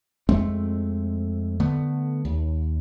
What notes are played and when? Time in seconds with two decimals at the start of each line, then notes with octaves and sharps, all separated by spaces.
0.29 F2 G#3 A3 C4
1.60 D3 A3 B3
2.25 D#2